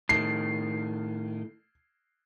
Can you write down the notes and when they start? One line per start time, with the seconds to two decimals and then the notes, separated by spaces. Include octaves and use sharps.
0.09 A2 D#3 C7